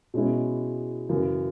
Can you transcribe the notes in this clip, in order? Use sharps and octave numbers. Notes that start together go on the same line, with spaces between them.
B2 G#3 C#4 E4
F#2 C#3 E3